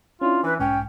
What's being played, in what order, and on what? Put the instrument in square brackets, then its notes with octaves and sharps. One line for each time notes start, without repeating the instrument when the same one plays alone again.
[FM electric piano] C#4 D4 E4 [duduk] F4
[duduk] E3 [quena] B4
[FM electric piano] B1 G#2 [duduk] C#4 [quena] G5